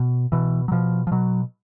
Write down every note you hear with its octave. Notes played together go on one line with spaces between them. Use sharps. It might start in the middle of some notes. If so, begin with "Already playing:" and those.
Already playing: B2
B2 E3
F#3
B2 F3
F3
B2 F#3